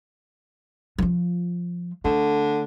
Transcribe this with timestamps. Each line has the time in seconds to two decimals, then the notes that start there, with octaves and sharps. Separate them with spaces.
0.98 F3 F4
2.05 D3 A3